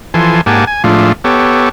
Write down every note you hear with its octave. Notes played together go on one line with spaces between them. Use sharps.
E3 F3 A4 G#5 C6
G#2 A#3 G4 F#5 G#5 A5
G#5
A2 F3 G#3 A3 D4 F4
B3 G4 A4 C#5